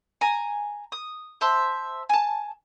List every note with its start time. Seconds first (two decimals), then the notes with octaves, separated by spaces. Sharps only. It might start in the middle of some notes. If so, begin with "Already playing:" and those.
0.21 G#5 A#5
0.92 D#6
1.41 C5 E5 A5 C6
2.09 G#5 A5